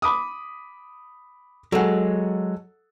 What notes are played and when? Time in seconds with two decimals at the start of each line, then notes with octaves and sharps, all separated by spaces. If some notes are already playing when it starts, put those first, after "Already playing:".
0.02 B5 D6 D#6
1.72 F#3 G#3 A4 F#5